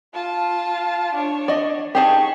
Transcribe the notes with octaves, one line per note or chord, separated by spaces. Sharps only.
F4 A5
D4 C#5
D5 D#5
D#4 G4 G#4 A5 C#6